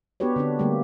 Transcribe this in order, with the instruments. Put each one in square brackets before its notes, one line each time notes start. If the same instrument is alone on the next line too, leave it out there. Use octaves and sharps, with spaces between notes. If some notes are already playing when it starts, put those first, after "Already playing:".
[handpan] B3 D4 F#4 G4 B4 C#5
D3 C4 D4
D3 G3 A3 A#3 G4